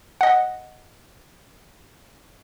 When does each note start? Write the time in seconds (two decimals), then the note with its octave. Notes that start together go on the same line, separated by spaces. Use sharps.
0.21 D#5 F#5